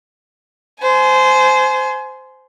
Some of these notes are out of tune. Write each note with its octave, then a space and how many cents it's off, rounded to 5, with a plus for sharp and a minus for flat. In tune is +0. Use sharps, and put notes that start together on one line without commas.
C5 -15 G#5 +30